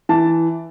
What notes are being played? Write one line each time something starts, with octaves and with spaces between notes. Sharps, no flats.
E3 A5